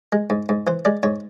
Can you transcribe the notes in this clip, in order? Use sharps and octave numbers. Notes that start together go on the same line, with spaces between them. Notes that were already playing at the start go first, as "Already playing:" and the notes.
G#3
G#2
G#2
E3 C5
G#3 D5
G#2 C#5